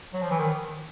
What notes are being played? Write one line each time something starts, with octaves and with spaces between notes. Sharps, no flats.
F#3
F3
E3
D#3